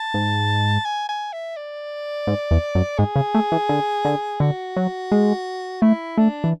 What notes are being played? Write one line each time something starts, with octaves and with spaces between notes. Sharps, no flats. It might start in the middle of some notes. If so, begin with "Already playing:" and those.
Already playing: A5
G#2
G#5
G#5
E5
D5
G#2
E2
F#2
G#2 G#4
C#3
A3
E3
D3
D3
D3 F#4
F#3
G#3
A3 E4
A3 D4
E3